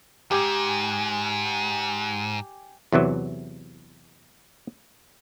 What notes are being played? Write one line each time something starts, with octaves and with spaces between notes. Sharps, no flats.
E2 G#2 G4 G#5
E2 C3 E3 F#3